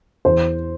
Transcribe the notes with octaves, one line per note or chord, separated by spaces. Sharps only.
E2 C5